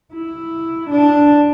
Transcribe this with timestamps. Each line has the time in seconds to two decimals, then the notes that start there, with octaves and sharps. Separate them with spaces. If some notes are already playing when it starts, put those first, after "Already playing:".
0.14 E4
0.91 D4